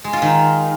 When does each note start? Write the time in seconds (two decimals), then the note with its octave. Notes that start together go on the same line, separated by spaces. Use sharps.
0.04 G#3
0.13 F4
0.22 D#3